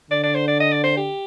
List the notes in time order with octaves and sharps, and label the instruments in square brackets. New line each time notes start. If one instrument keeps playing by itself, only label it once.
[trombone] D3 [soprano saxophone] D5
[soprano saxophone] D5
C5
D5
D#5
D5
C5
G4